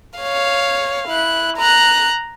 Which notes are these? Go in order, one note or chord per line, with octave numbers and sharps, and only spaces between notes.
C#5 F5
E4 F#6
A#5 F#6